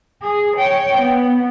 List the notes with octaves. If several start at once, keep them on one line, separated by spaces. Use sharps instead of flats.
G#4
C#5 G5
B3